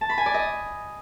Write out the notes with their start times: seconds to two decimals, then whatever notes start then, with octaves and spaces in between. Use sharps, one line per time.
0.01 A5
0.09 B5
0.18 G#5
0.26 D5
0.34 D#5